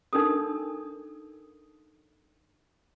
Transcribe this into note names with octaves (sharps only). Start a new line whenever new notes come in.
D4 D#4 A4 A#4 D#6